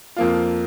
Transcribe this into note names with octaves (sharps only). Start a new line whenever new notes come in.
F2 F3 A#3 F4